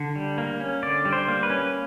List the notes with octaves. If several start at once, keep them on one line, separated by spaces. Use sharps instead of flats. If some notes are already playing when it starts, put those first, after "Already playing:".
Already playing: D3
G3
A#3
C#4
D3 D5
G3
C5
A#3
B4
C#4